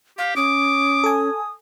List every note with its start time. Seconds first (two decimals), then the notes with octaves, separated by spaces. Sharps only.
0.18 G4 F5
0.36 C#4 D6 D#6
1.04 A4 G#5